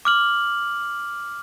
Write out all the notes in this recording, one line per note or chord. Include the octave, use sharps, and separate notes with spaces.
D6 F6 F#7